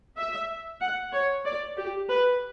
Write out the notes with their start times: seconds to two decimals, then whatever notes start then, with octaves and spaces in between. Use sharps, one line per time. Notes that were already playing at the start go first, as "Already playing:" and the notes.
0.17 E5
0.80 F#5
1.12 C#5
1.45 D5
1.77 G4
2.08 B4